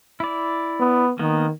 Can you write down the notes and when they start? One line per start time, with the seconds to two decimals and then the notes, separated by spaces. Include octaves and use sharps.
0.20 E4 D5
0.80 B3
1.19 D#3 A#3 B3